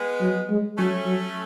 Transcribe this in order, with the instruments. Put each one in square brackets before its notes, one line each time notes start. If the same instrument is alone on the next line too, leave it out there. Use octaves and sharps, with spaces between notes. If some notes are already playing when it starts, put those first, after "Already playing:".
Already playing: [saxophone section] G#3 B3
[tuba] F#3
G#3
[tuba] F#3 [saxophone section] A3 C#4
[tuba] F#3